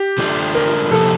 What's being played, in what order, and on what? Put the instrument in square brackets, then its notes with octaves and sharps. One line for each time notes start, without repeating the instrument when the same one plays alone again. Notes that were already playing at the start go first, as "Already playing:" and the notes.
Already playing: [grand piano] G4
[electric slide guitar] D3 A3 D4 F4
[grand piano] A#4
[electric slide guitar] C3 F3 A#3 D#4 G4 [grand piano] A4